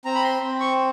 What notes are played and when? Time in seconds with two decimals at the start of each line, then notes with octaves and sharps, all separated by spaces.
0.05 C4 A#5
0.15 B5
0.24 C6
0.42 C4
0.60 C#6